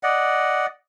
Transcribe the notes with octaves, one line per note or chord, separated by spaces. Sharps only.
D5 D#5 F#5